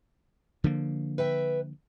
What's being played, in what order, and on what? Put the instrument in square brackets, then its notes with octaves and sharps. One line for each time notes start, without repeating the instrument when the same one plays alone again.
[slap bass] D3 F3 A#3
[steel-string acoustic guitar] B4 E5 G5